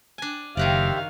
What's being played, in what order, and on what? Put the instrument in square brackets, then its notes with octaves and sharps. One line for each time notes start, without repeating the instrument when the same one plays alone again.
[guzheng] D4 G#5
[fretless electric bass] F#1 [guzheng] D#3 F#4 D5 [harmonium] G4 C5 E5 [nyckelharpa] F5